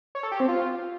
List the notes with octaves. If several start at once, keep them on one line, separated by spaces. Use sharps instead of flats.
C#5
A4
G4
C4
F4